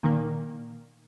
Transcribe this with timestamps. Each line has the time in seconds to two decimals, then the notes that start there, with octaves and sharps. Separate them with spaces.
0.03 A#2 D#3 A#3